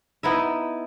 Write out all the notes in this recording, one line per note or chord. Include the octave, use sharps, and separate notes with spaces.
B3 D#4 E4 E5